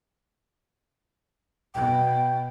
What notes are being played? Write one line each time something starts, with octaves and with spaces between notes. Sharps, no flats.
B2 G5